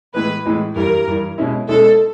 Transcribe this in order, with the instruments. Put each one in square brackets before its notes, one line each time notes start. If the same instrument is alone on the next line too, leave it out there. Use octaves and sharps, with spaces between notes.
[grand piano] A2 E3 G#3 [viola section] B4
[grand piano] A2 E3 G#3
[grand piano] G2 E3 G3 [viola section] A#4
[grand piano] G2 E3 G3
B2 G#3 C#4 E4
[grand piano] B2 G#3 C#4 E4 [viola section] A4